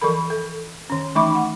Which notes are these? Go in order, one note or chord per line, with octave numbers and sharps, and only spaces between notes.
E3 F3 A4 A#4 B5
A4
D#3 C#4
E3 A3 D#4 E5 B5 D6
F#5